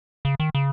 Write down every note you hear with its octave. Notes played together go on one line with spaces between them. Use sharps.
C#3
D#3
C#3